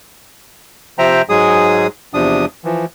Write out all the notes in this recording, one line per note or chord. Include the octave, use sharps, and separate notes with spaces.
C3 F3 C5 E5 G5 A#5
G#2 F#3 G#3 G#4 D#6
E2 C3 F3 D4 D#6
E3 F3